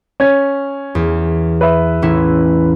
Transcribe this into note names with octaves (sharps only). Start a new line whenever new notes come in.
C#4 G#6
E2
B4 E5
A1 C#4 E4